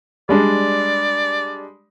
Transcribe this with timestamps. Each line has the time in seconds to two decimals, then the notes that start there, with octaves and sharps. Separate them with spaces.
0.29 G3 G#3 D4 D5